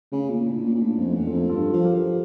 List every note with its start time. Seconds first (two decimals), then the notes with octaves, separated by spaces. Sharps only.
0.12 C#3 A3 C#4
0.30 A#2
0.47 A2 A#3 D4
0.64 A#2
0.75 A#2
0.81 A2 A#3 D4
0.98 F2
1.04 A3 C#4
1.16 E2
1.27 F4 A4
1.33 F2
1.49 G2 F4 A4
1.73 F3
1.85 G4 A#4
1.95 F3